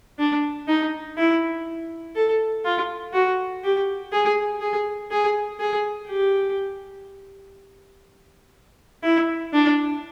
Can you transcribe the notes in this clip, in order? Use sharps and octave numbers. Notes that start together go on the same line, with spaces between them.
D4
D#4
E4
A4
F4
F#4
G4
G#4
G#4
G#4
G#4
G4
E4
D4